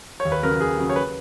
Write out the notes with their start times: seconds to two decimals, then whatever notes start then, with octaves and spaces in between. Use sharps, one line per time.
0.20 C#5
0.25 D#2
0.32 B4
0.43 C#3 F#3 A#4
0.60 D#2 G#4
0.78 C#3 F#3
0.89 C#5
0.96 B4